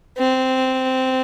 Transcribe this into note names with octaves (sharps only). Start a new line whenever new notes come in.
C4